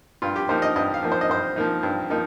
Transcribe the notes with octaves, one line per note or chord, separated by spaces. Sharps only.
G2 F4
G4
F3 A#3 D#4 C5
D#5
G2 D#5
F5
F3 A#3 D#4
C5
D#5
G2 C5
F3 A#3 D#4
G2
F3 A#3 D#4